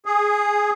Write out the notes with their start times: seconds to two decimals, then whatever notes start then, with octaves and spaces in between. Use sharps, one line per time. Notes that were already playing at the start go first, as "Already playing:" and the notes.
0.06 G#4